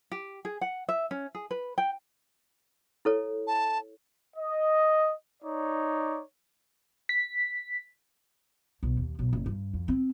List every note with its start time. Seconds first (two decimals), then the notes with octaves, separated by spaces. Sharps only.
0.12 G4
0.45 G#4
0.61 F#5
0.89 E5
1.11 C#4
1.35 G#4
1.51 B4
1.78 G5
3.05 E4 A4 C#5
3.47 A5
4.36 D#5
5.43 D#4 C#5 D5
7.09 B6
8.83 B1
8.97 D#2
9.19 B1
9.33 F#1
9.46 G2
9.73 F2
9.88 C4